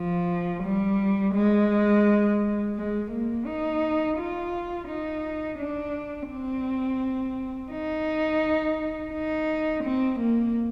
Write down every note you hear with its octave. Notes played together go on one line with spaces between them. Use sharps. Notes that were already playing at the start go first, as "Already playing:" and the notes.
Already playing: F3
G3
G#3
G#3
A#3
D#4
F4
D#4
D4
C4
D#4
D#4
C4
A#3